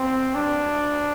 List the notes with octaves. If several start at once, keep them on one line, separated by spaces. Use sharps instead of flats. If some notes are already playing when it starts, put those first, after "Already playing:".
Already playing: C4
D4